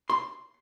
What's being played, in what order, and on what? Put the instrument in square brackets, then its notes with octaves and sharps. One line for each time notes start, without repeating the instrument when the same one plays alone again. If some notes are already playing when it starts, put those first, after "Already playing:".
[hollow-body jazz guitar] C6